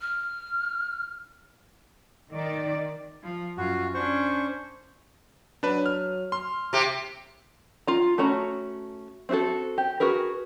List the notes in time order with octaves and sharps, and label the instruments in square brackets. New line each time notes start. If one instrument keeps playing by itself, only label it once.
[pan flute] F6
[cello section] D#3 D5
[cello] F3
[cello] F#2 F4 [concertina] F#4
[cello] C#4 D4 [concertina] C5 C#6
[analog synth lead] F#3 [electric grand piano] D4 B4
[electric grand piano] F6
[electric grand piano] C6 [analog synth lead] F6
[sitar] C3 G4
[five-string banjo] F4 A#5
A3 C#4 F#4 A#5 B5
C4 D#4 E4 F#4 A4
G4
F#4 G#4 A#4 B4